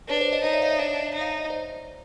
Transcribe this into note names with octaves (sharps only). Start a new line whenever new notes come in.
D4 B4 C#5
C5 D5
C#5 D#5
D#4 C#5 D#5
D5 E5
D#5 F5
D5 E5
D4 C#5 D#5
D#4
F5
E5
D#5
C5 D5